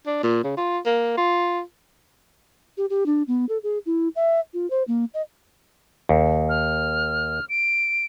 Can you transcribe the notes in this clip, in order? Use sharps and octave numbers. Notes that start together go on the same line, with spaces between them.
D4
A#2
C#3
F4
A#3
F4
G4
G4
D4
B3
A4
G#4
E4
E5
F4
C5
A#3
D#5
D#2
F6
D7